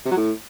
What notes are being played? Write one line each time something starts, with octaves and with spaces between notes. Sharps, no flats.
C3
F#3
A2